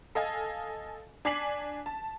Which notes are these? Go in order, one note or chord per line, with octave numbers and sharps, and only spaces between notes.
A4 D#5 F5 G#5
D4 G#5 D6 B6 C7 F#7
A5